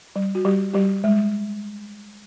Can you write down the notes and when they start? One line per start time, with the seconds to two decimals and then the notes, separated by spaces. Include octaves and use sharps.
0.16 G3
0.35 F#4
0.45 G3 G4
0.74 G3 G4
1.04 G#3